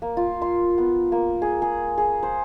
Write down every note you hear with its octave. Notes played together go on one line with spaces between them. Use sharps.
A#3
F4
C6
B3
A#3
G#4
G#4
G#4
C5